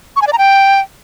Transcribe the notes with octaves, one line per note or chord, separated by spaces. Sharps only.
C#6
G#5
D5
A#5
G5